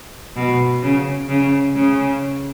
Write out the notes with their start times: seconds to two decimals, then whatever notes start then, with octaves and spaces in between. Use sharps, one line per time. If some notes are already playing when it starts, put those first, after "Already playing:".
0.36 B2
0.82 C#3
1.29 C#3
1.75 C#3